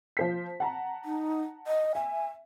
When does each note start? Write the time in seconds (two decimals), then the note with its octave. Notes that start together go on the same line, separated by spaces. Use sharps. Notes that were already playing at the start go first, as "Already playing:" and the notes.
0.17 F3 C5 B6
0.60 F#5 A5 A#5
1.05 D#4
1.67 D#5
1.95 E5 G#5